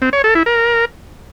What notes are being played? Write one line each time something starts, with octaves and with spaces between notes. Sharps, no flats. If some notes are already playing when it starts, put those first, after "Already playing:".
C4
C#5
A4
E4
A#4